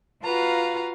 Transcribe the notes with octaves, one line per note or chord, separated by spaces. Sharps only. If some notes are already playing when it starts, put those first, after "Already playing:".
F4 F#4 B4 F5 A#5